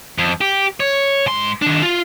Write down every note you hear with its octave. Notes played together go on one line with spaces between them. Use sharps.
F2
G4
C#5
G#2 C6
D#3 D4
F4